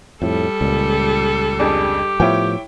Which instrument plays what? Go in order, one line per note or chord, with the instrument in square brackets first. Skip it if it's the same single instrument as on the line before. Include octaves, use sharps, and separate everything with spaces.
[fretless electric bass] F2 A2 [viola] G3 A4
[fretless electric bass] C#2 A#2
[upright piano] F2 D4 G#4 [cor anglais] G4
[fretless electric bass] A2 F3 B3 [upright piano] E4 C#5 G5